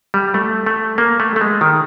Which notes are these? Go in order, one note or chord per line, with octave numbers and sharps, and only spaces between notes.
G3
A3
A3
A#3
A3
A3
G#3
D#3